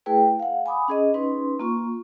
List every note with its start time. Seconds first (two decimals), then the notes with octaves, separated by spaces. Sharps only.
0.06 A3 E4 G#4 B4 G5
0.39 F5 F#5
0.66 G#5 B5 D6 D#6
0.88 C#4 G#4 D#5
1.14 C#4 D#4 B4 C6
1.60 A#3 F4 C#6